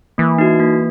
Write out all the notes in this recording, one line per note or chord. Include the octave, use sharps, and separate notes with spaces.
E3 A#3
D#4 F#4
A#3